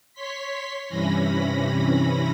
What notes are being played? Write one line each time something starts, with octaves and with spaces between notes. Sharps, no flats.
C#5 C6 B6
G2 C3 E3 C#4 B5 A#6